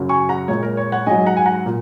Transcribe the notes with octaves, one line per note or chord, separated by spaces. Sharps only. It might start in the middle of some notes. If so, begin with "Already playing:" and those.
Already playing: F#2 C#3 F#3
G#5 C#6
F#5 A#5
A#2 G#3 C#5
A#4
C#5
C#5 F#5
G#2 F#3 D#5 G#5
F#5 A#5
G#5
F#5 A#5
A#2